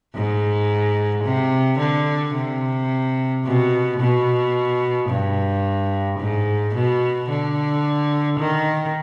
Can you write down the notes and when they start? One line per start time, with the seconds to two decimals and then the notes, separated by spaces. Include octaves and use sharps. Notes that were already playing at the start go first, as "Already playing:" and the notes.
0.15 G#2
1.24 C3
1.79 D3
2.34 C3
3.44 B2
4.00 B2
5.09 G2
6.19 G#2
6.75 B2
7.29 D3
8.39 D#3